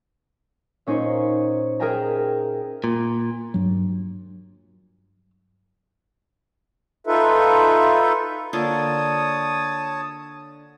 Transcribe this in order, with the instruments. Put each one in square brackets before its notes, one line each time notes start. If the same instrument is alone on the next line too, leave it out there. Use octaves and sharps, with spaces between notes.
[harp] A#2 C#4 D#4 C5 C#6
G#4 A#4 E5 G5 G#5 A#5
[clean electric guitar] A#2
[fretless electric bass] G2 F#3
[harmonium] D#4 F4 A4 B4 E5
[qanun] D3 A#3 F4 [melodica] C#5 A5 D#6